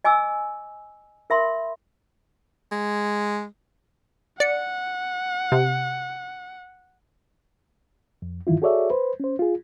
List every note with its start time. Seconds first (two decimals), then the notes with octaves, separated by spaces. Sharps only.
0.04 D#5 G#5 D6 E6
1.30 A#4 E5 B5 C6
2.72 G#3
4.40 D5 F#5 C#7
5.52 C3
8.22 F2
8.47 G2 D#3 E3 E4 F4
8.62 F#4 G#4 A4 C#5 D5 E5
8.90 B4 C5
9.20 C#4 C5
9.39 F4 G#4